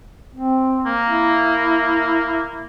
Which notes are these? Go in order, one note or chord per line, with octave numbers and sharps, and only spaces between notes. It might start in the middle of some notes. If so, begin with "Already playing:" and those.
C4
A#3
E4